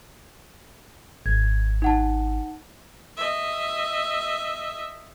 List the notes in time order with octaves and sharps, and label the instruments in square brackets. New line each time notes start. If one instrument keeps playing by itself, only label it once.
[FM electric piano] G#1 [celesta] G#6
[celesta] D#4 F#5 A5
[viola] D#5 E5